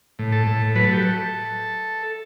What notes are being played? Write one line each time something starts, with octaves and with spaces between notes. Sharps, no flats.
A2
A4
A2
F#3 B4
A4
G4
A4